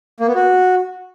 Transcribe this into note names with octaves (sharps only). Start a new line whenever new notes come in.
A#3
B3
F#4